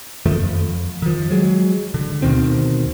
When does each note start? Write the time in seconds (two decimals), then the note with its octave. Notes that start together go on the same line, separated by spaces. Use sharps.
0.26 F#2 D#3 F3 A3
0.41 F2
1.02 D#3 F3
1.30 F#3 G#3
1.94 D3
2.22 D2 B2 D#3 C4